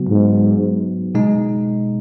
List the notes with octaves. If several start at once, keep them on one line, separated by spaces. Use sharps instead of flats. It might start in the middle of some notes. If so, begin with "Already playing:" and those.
Already playing: C#3 F#3 B3 F#4
G#2
B2 G#3 D#4